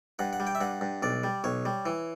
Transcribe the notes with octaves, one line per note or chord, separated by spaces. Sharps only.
G2 F#5
F#5
G3
G5
E5
G2 F#5
G2
B1 D5
G3
B1 C#5
G3
E3